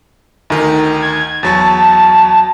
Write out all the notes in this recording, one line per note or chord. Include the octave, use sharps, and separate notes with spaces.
D2 D#3 D#4
G#6
E2 F#3 A5 C#6